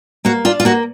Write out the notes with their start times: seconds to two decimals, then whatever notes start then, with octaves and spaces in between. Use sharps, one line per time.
0.25 A#3 F#4
0.45 D4 F4
0.60 F4
0.65 A#3 F#4